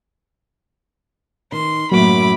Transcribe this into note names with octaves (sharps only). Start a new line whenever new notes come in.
D#3 C6
F#2 A2 F#3 A#3 B5 D6